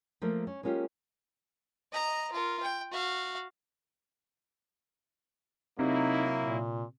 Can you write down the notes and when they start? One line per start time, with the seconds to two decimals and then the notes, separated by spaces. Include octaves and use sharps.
0.22 F3 A3 A#3 A#4
0.47 C#4
0.63 G#3 A#3 C#4 F4 G4
1.92 D#5 A#5
2.32 F4 A#4
2.62 G5
2.92 F#4 F5
5.79 C3 F#3 A#3 D#4 E4
6.42 A#2